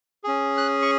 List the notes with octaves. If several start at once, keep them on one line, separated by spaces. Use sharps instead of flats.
C#4 G#4
F#6
C#6